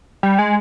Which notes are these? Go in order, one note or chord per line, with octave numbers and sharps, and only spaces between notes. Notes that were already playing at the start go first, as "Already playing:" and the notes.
G3
G#3